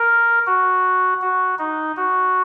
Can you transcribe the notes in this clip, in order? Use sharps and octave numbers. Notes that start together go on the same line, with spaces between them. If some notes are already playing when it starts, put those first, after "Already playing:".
Already playing: A#4
F#4
F#4
D#4
F#4